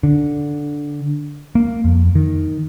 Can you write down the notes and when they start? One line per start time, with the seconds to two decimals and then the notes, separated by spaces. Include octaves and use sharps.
0.03 D3
1.55 A#3
1.84 F2
2.15 D#3